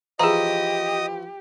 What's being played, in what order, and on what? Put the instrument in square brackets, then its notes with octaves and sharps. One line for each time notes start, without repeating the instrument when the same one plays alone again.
[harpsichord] E3 F3 [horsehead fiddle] G4 [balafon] G#4 A#5 [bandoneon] D#5 D#6